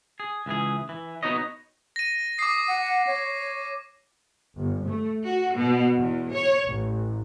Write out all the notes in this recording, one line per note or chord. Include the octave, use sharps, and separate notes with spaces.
G#4
C#2 E3 G#4
E3
B3 D#4 F#4 C#5 D#5
A#6 D#7
D6 D#6 C7
F#5
C#5
G1
A3
F#4
B2
E2
C#5
A1